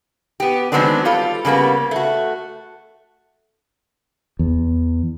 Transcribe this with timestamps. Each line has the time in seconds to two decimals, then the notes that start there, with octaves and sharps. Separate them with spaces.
0.40 B3 G4
0.72 D#3 F#3 G#3 B3 C4 D4
1.05 G3 F4 A4
1.45 C#3 G3 A#3 B3
1.91 A3 F#4
4.39 E2